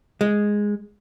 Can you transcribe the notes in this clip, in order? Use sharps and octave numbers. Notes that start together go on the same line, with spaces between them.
G#3